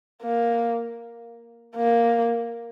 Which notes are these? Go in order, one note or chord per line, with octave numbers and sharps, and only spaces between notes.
A#3
A#3